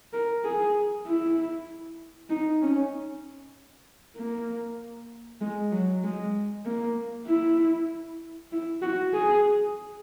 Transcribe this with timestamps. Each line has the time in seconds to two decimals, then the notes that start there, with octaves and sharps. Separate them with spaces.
0.13 A#4
0.44 G#4
1.07 E4
2.30 D#4
2.62 C#4
4.17 A#3
5.41 G#3
5.72 F#3
6.03 G#3
6.65 A#3
7.27 E4
8.52 E4
8.82 F#4
9.14 G#4